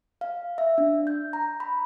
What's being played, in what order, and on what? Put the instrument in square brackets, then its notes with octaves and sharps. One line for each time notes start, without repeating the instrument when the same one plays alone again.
[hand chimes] F5
E5
D4
G6
A#5
B5